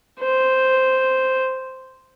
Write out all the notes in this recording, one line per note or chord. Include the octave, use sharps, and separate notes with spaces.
C5